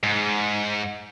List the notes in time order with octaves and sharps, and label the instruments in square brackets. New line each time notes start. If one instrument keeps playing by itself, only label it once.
[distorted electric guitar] G#2